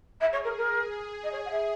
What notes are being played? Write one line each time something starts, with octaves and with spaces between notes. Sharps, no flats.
G#4 E5
C#5
A#4
G#4 A#4
D#5
C#5
F#5
E5